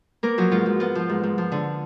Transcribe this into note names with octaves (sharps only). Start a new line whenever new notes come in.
A#3 B3 A#4
F3 F#3 F#4
G#2 F4
G#2
B3 F4
F3
G#2
G#2
F3
D3